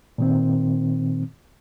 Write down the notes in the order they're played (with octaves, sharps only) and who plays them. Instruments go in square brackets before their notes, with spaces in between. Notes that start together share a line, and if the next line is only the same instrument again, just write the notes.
[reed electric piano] A#2 D#3 C4